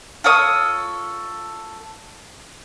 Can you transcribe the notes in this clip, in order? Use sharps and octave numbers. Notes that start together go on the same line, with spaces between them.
F4 A4 C#5 D#6